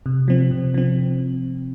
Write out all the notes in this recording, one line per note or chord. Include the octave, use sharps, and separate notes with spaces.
C3
F3 C4
C3
F3 C4